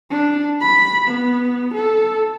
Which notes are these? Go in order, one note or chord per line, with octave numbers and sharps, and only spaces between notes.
D4
B5
B3
A4